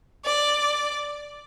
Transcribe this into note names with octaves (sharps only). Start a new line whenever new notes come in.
D5